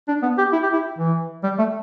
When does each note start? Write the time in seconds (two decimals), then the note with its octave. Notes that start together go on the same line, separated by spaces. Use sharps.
0.08 D4
0.23 B3
0.38 G4
0.53 E4
0.63 G4
0.73 E4
0.98 E3
1.44 G3
1.59 A3